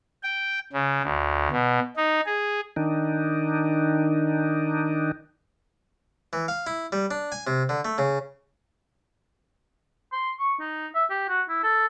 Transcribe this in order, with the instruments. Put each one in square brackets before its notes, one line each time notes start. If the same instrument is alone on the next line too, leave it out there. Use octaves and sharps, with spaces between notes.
[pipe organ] G5
C#3
D2
B2
D#4
G#4
[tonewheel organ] D#3 D4 D#4
[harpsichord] E3
F5
E4
G3
D4
G#5
C3
D3
A3
C#3
[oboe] C6
C#6
D#4
E5
G4
F#4
E4
A4